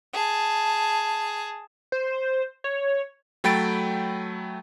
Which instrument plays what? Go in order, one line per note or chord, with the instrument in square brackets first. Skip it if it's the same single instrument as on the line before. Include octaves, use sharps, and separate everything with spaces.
[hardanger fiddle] G#4 A5
[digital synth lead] C5
C#5
[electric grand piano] F#3 A3 G5 B5 A6 D7